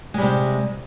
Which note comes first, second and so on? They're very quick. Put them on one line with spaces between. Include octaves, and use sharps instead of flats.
G#3 G3 C3